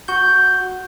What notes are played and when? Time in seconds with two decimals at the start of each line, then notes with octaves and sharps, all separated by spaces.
0.08 F#4 G6